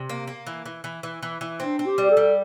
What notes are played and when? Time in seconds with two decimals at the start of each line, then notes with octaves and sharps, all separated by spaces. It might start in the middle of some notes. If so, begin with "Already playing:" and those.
Already playing: C3
0.09 A#3
0.27 A#3
0.47 E3
0.66 E3
0.84 E3
1.03 E3
1.23 E3
1.41 E3
1.60 C4 D4
1.79 C4
1.86 G4
1.98 G3
2.10 A4
2.17 G3